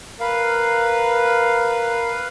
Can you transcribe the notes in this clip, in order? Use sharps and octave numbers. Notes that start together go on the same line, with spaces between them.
A#4 B4 F5